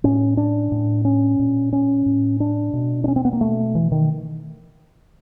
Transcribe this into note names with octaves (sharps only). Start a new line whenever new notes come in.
A2 C#4
D4
A2
C#4
A#2
C#4
A2
D4
B2
D4
C#4
C4
B3
A#3
B2 A3
E3
D#3